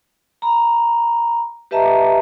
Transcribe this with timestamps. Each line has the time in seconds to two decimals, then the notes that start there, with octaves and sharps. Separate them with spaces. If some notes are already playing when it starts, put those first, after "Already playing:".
0.42 A#5 B5
1.71 G4 B4 D#5 E5 A5 A#5